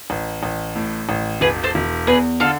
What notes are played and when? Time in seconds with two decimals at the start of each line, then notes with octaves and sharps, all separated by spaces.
0.10 A1
0.43 A1
0.75 A2
1.09 A1
1.41 E1 G#4 B4
1.64 A4 C5
1.75 E1
2.07 E2 G#4 B4
2.40 D3 F4 A4